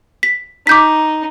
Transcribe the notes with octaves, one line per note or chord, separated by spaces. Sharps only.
B6
D#4 D6 G6 B6